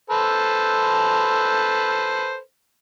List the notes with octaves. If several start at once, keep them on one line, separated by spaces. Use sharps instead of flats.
A4 B4 C5